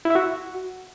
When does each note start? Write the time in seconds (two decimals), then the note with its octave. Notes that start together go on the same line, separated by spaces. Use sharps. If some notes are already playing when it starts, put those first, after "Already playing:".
0.05 E4
0.10 E5
0.15 F#4